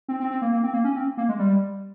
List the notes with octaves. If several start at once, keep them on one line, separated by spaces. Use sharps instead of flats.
C4
C4
C4
A#3
A#3
C4
A#3
C#4
C4
A#3
G#3
G3